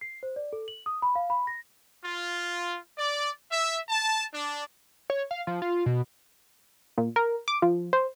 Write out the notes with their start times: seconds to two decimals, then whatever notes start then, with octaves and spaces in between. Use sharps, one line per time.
0.01 C7
0.23 C5
0.36 D5
0.53 A4
0.68 F#7
0.86 D#6
1.02 B5
1.15 F5
1.30 B5
1.47 A#6
2.04 F4
2.98 D5
3.50 E5
3.88 A5
4.32 D4
5.10 C#5
5.31 F5
5.47 F3
5.62 F4
5.86 B2
6.98 A#2
7.16 A#4
7.48 D6
7.62 F3
7.93 C5